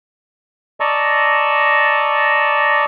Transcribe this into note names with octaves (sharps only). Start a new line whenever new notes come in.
D5 D#5 A5 A#5 C#6 E6